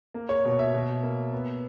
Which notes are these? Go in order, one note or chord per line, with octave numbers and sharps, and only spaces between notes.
A#3
C#5
B2
E5
B2
A#3
B3